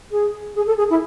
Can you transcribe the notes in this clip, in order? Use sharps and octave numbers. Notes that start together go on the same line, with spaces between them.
G#4
G#4
A4
G#4
E4